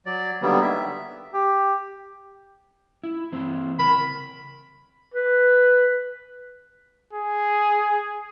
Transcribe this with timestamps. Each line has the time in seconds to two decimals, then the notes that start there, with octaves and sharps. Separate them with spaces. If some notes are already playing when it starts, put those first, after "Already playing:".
0.06 F#3 D5
0.42 D3 D#3 F#3 G3 A#3 B3
0.62 E5
1.34 G4
3.04 E4
3.32 E3 C4 E4
3.79 C#3 A#4 B5
5.14 B4
7.13 G#4